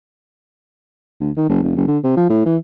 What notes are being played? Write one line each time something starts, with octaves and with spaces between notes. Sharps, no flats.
D2
D#3
F#1
F1
F#1
D3
C3
F3
A2
E3